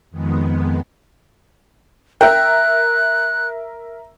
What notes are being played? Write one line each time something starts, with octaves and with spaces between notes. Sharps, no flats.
F2 D#3 G#3 B3
A#4 E5 G5 F#6